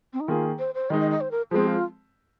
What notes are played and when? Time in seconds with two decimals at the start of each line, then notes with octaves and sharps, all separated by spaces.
0.13 C4
0.20 D#4
0.28 D#3 A#3 F4 G#4
0.59 C5
0.75 C5
0.90 D#3 G#3 D#4 D#5
1.01 D#5
1.11 D#5
1.21 C5
1.31 A#4
1.51 F3 G#3 C4 G#4
1.67 F4